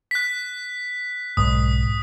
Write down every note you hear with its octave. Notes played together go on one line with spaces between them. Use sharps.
F#6 B6
B1 G#2 D#6